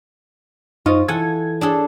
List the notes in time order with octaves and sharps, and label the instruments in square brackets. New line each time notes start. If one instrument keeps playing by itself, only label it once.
[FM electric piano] F#2 D#4 D#5 [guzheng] F4 [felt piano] C5 C#6
[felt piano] E3 [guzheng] A4 F#5 G#5 [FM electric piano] G#6
[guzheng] D4 G#4 A4